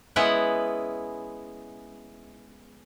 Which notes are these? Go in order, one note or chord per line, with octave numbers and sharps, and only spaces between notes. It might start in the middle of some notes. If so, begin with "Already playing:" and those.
G#3 B3 C#4 E4 F#5